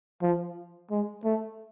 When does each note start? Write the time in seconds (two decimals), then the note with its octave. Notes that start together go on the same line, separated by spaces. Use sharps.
0.22 F3
0.90 G#3
1.24 A3